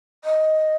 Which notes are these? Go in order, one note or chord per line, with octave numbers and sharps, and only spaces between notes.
D#5